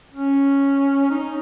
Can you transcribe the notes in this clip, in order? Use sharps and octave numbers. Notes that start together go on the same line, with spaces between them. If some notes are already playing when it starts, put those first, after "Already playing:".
C#4
D#4